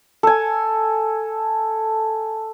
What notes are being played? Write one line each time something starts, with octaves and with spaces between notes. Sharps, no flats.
A4 G#5